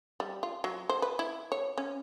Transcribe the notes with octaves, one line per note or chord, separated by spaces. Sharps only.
G3
F4
F#3
C5
B4
E4
C#5
C#4